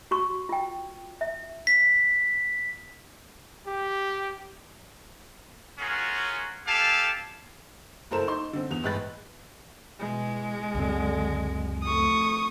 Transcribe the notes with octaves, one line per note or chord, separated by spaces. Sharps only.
F#4 C#6
F4 G5
E5
B6
G4
C#4 F4 F#4 G#4 A#4
G4 A4 F5 G#5 A5
F#1 E4 A4 A#4 C5 E7
D#4 C6
D3 C4
E2 F7
G1 A2 G#3 B4 F#6 A6
B2 E3 G#3
C#2 F#2 D3 C4
F2 A3 C#6 D#6